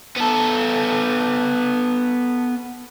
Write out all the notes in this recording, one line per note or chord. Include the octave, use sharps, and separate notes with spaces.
B3 A4